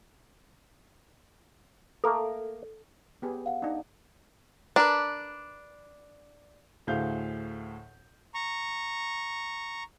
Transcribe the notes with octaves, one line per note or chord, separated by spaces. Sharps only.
A3 A#3 A4 A#4
B3 G4 G#4
F5 F#5
D4 D#4
D4 A#4 B4
D2 A2 G#4 C5 F5 G6
A#5 C#6